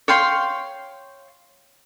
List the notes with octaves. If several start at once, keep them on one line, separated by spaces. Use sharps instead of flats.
C#5 F5 G5 C6